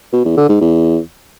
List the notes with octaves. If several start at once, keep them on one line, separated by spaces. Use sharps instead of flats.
B2
E2
D3
G#2
E2